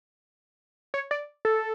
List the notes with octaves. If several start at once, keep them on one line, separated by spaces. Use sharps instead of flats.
C#5
D5
A4